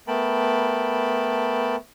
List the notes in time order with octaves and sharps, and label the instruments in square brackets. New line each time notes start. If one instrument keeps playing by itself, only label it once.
[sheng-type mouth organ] A3 B3 A#4 G5 A5 B5